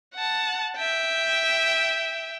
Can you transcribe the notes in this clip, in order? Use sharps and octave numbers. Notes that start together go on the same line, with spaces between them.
F#5 A5
E5 G5